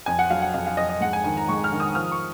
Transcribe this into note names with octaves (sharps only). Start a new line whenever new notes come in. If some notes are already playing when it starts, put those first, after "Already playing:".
F2 G#5
F#5
F#3 F5
F#5
F2 F5
F5
F2 D#5
D#5
G#2 F#5
G#5
D#3 G#5
A#5
G#2 C#6
F6
D#3
D#6
F3 F6
C#6